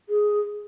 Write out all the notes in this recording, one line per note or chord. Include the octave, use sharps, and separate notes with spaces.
G#4